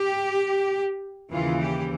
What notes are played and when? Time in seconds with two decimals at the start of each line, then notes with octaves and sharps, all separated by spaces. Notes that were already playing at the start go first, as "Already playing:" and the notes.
Already playing: G4
1.31 D#2 C#3 E3 F4
1.61 G4